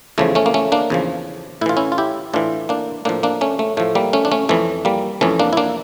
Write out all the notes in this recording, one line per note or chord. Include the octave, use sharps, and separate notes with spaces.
E2 C#3 F3 A3
A3 C#4
A#3
A3 C#4
A#3 D4
E2 C#3 F3
A2 E3 E4 F4
C#4 E4
F4
E4 G4
A2 E3 D4 F4
A#3 D4
A2 F3 A#3 D4
A#3 D4
A3 C#4
A3
A2 F3 A3
G3 A#3
A3 C#4
D4
A3 C#4
F2 E3 A3
G3 A#3
F2 E3 A3 C#4
A#3 D4
E4
A#3 D4